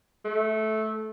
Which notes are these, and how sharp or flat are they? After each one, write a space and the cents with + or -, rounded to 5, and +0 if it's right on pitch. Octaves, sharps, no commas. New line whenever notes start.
A3 -15